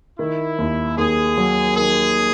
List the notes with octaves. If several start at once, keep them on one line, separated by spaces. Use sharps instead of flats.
D#3 E4
D#2
D#2 G#4
F#3
D#3 G#4